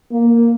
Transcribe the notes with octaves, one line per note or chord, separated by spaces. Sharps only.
A#3